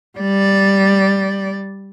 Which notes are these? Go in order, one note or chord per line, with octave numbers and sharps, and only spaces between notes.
G3 D5